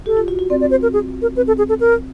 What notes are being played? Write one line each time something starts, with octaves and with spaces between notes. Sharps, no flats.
G4 A4
F4
F#4
F#4
C4 D5
D5
C5
A#4
G#4
A#4
C4 B4
A4
G#4
A4
A#4